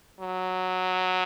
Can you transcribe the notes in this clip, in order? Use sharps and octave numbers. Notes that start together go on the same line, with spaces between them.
F#3